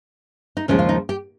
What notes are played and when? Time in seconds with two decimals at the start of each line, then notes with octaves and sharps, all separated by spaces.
0.57 D#4
0.68 D#2 C#3 F3 G#3 C#4
0.79 F4
0.89 D#4
1.09 G4